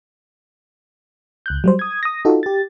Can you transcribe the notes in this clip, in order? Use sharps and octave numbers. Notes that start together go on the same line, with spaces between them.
C#2 F#6 G6
F#3 G3 C5
D#6 G#6
D#6 A#6
D#4 F4 F#4 A4
G4 A6